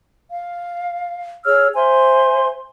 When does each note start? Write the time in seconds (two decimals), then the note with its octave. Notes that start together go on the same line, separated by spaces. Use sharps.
0.30 F5
1.45 G#4 C#5 E6 F6
1.75 C5 E5 G#5 C6